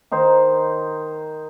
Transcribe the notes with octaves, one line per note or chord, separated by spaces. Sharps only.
D#3 D#4 C5